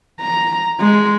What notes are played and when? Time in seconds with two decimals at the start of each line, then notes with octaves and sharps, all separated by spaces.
0.21 A#5
0.80 G#3